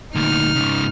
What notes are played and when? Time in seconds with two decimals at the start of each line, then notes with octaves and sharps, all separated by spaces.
0.15 D2 A#2 D#4 F6
0.55 G#2 C#3